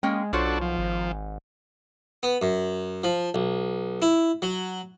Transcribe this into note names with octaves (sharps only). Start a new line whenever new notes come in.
G#3 A#3 C#4 G5
B1 D4 F4 F#4 A4 C5 C#5
F3
G#1
B3
F#2
F3
B1
E4
F#3